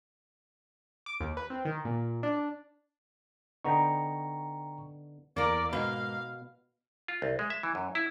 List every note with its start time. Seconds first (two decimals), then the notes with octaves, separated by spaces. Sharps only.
1.06 D6
1.21 D#2
1.37 B4
1.50 C4
1.65 D#3
1.85 A#2
2.23 D4
2.37 D4
3.65 D3 B3 D#4 G5 A#5 C#6
5.37 E2 A#3 A#4 D5
5.73 G#2 B2 A#3 F5 B5
7.08 F4
7.22 C2
7.39 G#3
7.50 E5
7.63 E3
7.75 F#2
7.95 E4